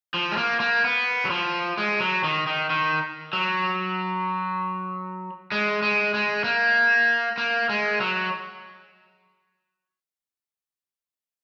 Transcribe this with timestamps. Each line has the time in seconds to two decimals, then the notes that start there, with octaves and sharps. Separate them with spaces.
0.14 F3
0.32 G#3
0.37 A#3
0.60 A#3
0.84 B3
1.25 F#3
1.30 F3
1.77 G#3
2.00 F#3
2.24 D#3
2.47 D#3
2.70 D#3
3.33 F#3
5.52 G#3
5.82 G#3
6.14 G#3
6.44 A#3
7.38 A#3
7.69 G#3
8.01 F#3